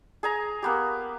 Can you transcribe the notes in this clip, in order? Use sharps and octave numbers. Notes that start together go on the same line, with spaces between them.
G#4 G#5 A#5
A#3 B3 G4